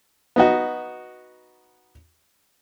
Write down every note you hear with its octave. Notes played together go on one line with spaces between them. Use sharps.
B3 D#4 F#4